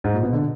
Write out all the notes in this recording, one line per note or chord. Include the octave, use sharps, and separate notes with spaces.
G#2
A#2
B2
D3